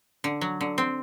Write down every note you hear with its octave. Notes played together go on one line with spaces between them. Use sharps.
D3
F#3
D3
C4